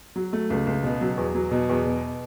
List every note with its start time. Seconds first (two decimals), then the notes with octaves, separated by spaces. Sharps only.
0.16 F#3
0.33 A3
0.50 C#2
0.67 C#2
0.84 B2
1.01 F#3
1.18 E2
1.35 F#3
1.51 B2
1.69 E2
1.86 B2